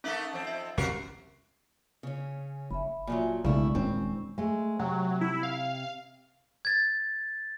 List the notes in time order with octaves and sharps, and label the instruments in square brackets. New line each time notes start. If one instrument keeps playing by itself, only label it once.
[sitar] A3 A#3 D#4 [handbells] C#4 E5 B6
[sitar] F2 C4
[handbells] E5
[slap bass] E2 C3 C4 [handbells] C#4 G4 C7 [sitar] F#4 A#4
[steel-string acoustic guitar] C#3 C#4
[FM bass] F#1 [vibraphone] E5 B5
[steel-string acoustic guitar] A#2 F3 F#3 [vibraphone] E5 G#5
[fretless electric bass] B1 A3 [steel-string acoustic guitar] G2 E4 [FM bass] C#3 [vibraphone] G#3 C#6
[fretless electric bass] D#1 D#2 C#4 [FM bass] A#2 [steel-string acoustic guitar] C4
[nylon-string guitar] G#3 A3
[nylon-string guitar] C3 [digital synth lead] F#3
[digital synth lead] E4
F5
[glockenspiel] G#6 A6